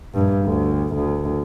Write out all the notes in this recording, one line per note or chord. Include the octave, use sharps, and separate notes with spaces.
A#1 G2
D2
D2